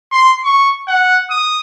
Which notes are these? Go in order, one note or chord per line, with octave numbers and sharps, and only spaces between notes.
C6
C#6
F#5
D#6